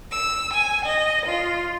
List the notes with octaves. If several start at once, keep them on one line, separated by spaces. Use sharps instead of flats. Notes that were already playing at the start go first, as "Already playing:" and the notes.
E6
G#5
D#5
F4